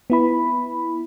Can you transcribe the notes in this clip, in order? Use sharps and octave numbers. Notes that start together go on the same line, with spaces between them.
B3 E4 B5